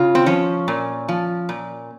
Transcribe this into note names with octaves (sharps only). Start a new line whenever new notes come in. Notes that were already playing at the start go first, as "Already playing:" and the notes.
Already playing: C#3 F4
C4
F3 C#4
A#2
F3
A#2